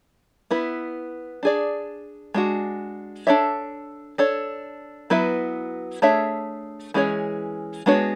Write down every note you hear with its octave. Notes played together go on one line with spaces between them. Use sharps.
B3 E4 B4
D4 G#4 D5
G#3 D4 F#4
D4 A4 C#5 E5
D4 A4 C#5
F#3 B3 E4 B4 E5
A3 D4 G#4 C#5 E5
E3 G#3 C#4 G#4 C#5
G#3 B3 D4 F#4 C#5